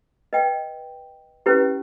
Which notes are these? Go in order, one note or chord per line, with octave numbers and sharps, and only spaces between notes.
B4 D#5 G5
C#4 E4 G4 B4